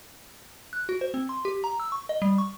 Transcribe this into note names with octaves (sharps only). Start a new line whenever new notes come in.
F#6
F#4
C5
C4
C6
G4
A#5
E6
C#6
D#5
G3
C#6